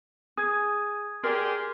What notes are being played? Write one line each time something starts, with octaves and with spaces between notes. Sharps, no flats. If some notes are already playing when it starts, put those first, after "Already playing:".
G#4 D#6 G#6
G4 G#4 A#4 D5 C6